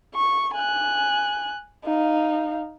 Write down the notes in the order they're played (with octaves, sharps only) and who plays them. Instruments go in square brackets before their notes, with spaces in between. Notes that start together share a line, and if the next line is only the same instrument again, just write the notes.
[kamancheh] C#6
G#5 F#6
D#4 F5